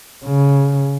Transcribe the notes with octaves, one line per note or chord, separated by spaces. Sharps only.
C#3